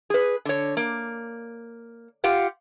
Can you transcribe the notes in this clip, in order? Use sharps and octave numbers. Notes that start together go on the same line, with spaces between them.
G#4 B4
D3 C#5
A#3
F4 G4 F5 F#5